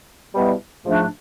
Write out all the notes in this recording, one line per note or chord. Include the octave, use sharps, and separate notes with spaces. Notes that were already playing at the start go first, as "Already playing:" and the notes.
B2 G3 B3 E4
G#2 F3 A3 D4